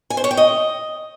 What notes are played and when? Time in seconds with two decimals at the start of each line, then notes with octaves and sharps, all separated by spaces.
0.10 G#5
0.17 C5
0.24 C#5
0.31 G5
0.37 D#5